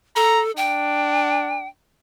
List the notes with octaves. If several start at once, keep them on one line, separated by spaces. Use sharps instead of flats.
A4 A#5
D4 G5